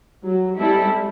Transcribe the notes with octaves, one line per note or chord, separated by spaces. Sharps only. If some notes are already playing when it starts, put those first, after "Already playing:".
F#3
G3 G#3 C4 E4 A4